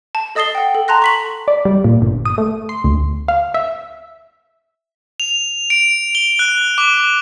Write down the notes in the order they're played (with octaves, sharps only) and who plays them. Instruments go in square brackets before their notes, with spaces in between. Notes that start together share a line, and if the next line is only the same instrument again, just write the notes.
[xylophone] A5
A4 D#5 D#6 A6 C7 G7
F#5 G5
A4
A5 A#5 C6 F#6 A#6
C#6 B6 F#7
[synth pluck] D5
G3
A#2
G1
D#6
A3
C6
D2
F5
E5
[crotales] F7
D7
G7
F#6
D6